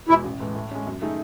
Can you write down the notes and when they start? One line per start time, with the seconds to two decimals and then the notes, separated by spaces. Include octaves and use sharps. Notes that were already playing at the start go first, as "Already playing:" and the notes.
0.09 E2 B2 G#3 E4
0.24 A1
0.40 A2 E3 G#3
0.55 A2
0.71 G#3 C#4
0.87 F#2
1.02 D#3 A3 D#4 G#4